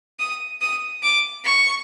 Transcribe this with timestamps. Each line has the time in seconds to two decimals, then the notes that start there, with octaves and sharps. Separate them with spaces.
0.19 D#6
0.61 D#6
1.03 D6
1.45 C#6